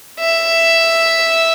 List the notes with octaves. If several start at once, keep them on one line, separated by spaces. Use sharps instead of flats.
E5